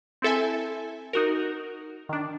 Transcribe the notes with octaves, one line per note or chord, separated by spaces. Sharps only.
C4 E4 A4 E5 G#5
D#4 F#4 A#4
D#3 D4